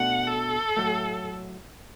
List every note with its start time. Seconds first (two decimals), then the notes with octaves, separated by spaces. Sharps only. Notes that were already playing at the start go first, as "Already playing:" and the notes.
Already playing: B2 A3 D4 F#5
0.27 A4
0.77 A2 F#3 A3